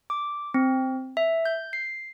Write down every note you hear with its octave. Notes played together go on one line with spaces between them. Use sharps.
D6
C4
E5
G6
C7